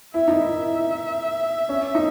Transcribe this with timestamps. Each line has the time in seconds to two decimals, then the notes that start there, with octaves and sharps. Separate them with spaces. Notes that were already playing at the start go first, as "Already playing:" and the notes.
0.14 E4 E5
0.28 D#4
0.41 E4
1.69 C#4
1.95 D#4